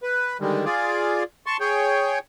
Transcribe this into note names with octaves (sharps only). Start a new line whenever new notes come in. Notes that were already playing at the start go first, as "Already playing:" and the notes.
B4
D3 D#3 G3 G#3
F4 G#4 D5
A5 C6 C#6
G#4 C#5 G5